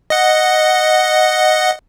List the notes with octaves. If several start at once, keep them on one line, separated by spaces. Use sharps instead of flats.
D#5 F#5